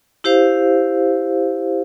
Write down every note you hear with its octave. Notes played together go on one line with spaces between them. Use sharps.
E4 G4 C5 F5